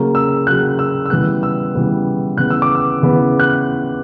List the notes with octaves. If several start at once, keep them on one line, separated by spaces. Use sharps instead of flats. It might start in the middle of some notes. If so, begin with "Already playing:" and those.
Already playing: C#3 F#3 A#3
E6
C#3 F#3 A#3 F#6
E6
E6
C#3 E3 G3 B3 F#6
E6
C#3 E3 G3 B3
C#3 E3 B3 F#6
E6
D6
E6
C#3 E3 B3
F#6